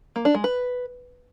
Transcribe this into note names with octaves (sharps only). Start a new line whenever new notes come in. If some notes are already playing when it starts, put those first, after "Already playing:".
A#3
D4
G#3
B4